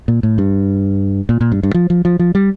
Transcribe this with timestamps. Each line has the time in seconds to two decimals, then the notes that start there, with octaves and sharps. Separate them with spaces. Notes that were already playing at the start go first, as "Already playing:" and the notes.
0.08 A#2
0.23 A2
0.38 G2
1.29 A#2
1.41 A#2
1.52 G2
1.63 G2
1.74 F3
1.90 F3
2.05 F3
2.19 F3
2.35 G3